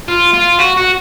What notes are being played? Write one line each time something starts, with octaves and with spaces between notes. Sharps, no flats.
F4
F4
F#4
F#4